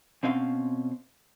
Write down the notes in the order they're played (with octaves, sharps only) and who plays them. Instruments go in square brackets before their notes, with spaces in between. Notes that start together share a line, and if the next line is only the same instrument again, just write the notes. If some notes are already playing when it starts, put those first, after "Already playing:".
[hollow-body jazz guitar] B2 C4 C#4 F5 C6